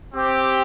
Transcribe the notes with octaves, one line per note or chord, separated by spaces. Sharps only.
C4 G4